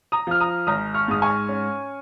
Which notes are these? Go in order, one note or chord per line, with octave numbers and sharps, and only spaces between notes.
A#5 D#6
F3 F6
A#5 D#6
G#1 A#5 D#6
C#6 F6
G#2 D#6
G#5 C#6
C#4